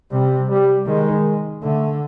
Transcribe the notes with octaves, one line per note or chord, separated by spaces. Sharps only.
C3 G3
G3
D#3 G#3
D3 A3